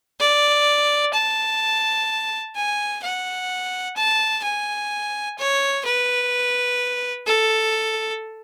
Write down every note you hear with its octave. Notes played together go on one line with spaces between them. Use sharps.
D5
A5
G#5
F#5
A5
G#5
C#5
B4
A4